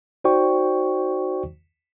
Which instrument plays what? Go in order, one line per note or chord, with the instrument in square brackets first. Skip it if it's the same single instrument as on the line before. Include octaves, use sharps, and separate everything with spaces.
[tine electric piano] D#4 F#4 C5 D5 G5 C#6